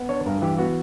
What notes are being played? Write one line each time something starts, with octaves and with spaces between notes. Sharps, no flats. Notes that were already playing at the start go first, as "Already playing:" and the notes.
Already playing: B3
D4 C#5
G2 A#4
E3 G4
B3 F#4